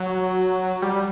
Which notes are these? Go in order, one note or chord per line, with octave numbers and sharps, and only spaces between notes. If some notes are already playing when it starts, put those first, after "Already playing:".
Already playing: F#3
G3